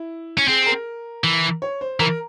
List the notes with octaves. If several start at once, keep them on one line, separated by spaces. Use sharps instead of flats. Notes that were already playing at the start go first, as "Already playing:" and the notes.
Already playing: E4
C#4
C4 G#4
G#4
A#4
E3
C#5
C5
E3 A#4